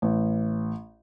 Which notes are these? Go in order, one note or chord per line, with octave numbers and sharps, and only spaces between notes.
A1